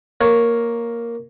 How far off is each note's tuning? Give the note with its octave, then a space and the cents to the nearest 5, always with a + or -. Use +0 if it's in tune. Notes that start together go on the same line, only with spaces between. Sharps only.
A#3 +0 C#5 +0